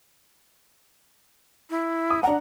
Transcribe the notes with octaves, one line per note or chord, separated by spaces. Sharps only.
E4
D#6
D4 F#5 A#5